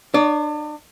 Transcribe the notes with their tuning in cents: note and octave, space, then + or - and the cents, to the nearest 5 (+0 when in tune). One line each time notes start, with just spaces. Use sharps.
D4 +40 D5 -40